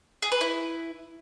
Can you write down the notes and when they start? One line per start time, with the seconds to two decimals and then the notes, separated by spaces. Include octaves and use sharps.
0.22 G#4
0.32 B4
0.41 E4